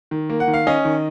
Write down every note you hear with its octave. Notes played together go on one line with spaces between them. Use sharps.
D#3
A#3
F#5
D#3
F5
C#4 D#5
D#3